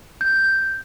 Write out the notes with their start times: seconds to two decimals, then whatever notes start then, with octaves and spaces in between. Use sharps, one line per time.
0.21 G6